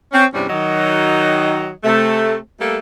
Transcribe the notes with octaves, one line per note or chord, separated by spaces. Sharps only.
C4 C#4
E2 G2 C3 G3 C#4 D4
D#3 F#3 D#5
C3 A3
G3 A3 A#3 A4